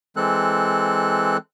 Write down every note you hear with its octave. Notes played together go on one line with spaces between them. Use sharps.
E3 G#3 C4 A4 F#6